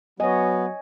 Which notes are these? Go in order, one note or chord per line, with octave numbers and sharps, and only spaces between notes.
F#3 B3 C#5 D#5 G#5